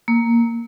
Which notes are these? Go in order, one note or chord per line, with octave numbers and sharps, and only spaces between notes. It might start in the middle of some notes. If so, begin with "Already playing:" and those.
A#3